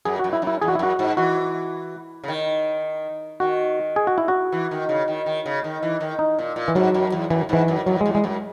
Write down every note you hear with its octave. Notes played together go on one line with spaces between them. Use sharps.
F#2 G#4
F#2 F#4
E4
F#2
E4
E2 G#4
F#4
E4
F#2 F#4
G#2
E3 F#4
C#3
D#3
D#3 F#4
G#4
F#4
E4
F#4
E3
D#3
C#3
D#3
D#3
C#3
D#3
E3
D#3
D#4
A#2
A#2
E3
G#2 F#3
F#2
E2
F#2 E3
G#2 E3
F#2
F#2 F#3
G#3
E2
G#3
F#2